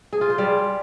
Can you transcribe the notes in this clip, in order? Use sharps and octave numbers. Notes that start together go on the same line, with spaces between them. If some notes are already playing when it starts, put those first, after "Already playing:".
G#4
F4
C5
G3